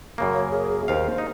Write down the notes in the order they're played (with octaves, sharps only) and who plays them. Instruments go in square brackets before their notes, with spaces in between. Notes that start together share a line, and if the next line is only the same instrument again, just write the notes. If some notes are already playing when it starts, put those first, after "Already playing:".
[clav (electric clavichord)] F#2 C#3 A#3
[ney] C#5
G#4
[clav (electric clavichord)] D#2 F5 [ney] C5
[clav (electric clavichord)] D#4